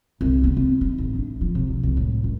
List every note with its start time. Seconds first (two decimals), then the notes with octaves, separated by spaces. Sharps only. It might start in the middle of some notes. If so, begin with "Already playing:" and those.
0.21 C2
0.44 B3
0.57 C4
0.81 D#4
0.98 A1
1.15 D4
1.41 F3
1.55 C3
1.70 F3
1.83 C2
1.97 A2
2.24 C#2